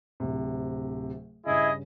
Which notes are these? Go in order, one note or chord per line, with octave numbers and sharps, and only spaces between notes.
D1 C3
G2 C#3 E4 G#4 D#5